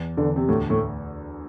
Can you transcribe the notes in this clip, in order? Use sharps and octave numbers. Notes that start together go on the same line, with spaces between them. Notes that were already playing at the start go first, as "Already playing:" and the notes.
Already playing: E2
E2 D3
C3
D2 A2
A2